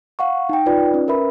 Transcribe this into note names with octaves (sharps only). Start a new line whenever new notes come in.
F5 F#5 C#6
D#4 G5
D#4 F4 B4 D5
C#4
A#4 B4 E5 B5